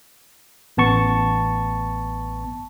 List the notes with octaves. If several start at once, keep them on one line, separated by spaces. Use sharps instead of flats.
A1 B3 A5 C#6